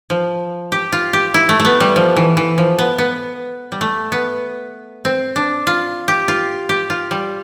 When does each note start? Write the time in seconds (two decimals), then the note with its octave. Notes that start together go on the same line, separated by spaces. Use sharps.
0.10 F3
0.72 G4
0.92 F4
1.13 G4
1.34 E4
1.49 A3
1.60 A3
1.65 B3
1.80 G3
1.96 F3
2.16 E3
2.37 E3
2.58 F3
2.78 B3
2.98 B3
3.72 G3
3.81 A3
4.12 B3
5.05 C4
5.36 D4
5.67 F4
6.08 G4
6.28 F4
6.69 G4
6.90 F4
7.11 G3